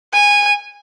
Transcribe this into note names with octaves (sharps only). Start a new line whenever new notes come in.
G#5